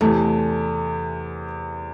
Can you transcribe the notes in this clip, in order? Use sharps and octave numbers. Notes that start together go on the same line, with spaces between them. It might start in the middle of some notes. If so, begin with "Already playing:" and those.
E2 C3 E3 A3